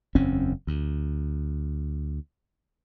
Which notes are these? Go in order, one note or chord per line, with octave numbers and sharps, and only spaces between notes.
F#1 E2 C4 C#4
D2